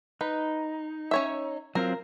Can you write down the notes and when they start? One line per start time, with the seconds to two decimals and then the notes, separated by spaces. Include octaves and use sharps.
0.21 D#4 B4
1.11 C#4 C#5 E5
1.75 F#3 C4 F4 A#4